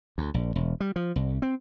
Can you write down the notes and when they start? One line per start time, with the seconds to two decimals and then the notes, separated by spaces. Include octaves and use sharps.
0.18 D2
0.34 A#1
0.56 E1
0.80 G3
0.96 F3
1.16 C2
1.42 C4